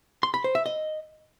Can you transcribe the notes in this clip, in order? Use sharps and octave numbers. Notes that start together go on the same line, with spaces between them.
C6
B5
C5
E5
D#5